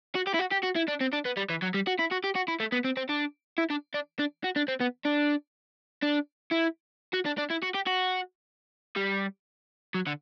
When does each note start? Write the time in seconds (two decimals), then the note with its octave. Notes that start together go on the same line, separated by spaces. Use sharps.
0.15 F#4
0.27 G4
0.34 E4
0.39 F#4
0.52 G4
0.64 F#4
0.76 E4
0.88 D4
1.01 C4
1.13 D4
1.25 B3
1.37 G3
1.50 E3
1.62 F#3
1.74 G3
1.87 F#4
1.99 E4
2.11 F#4
2.24 G4
2.35 F#4
2.48 E4
2.60 A3
2.72 B3
2.84 C4
2.97 C4
3.09 D4
3.58 E4
3.70 D4
3.94 D4
4.19 D4
4.44 F#4
4.56 D4
4.68 C4
4.81 B3
5.05 D4
6.03 D4
6.52 E4
7.13 F#4
7.25 D4
7.38 D4
7.50 E4
7.62 F#4
7.74 G4
7.86 F#4
8.96 G3
9.95 F#3
10.07 D3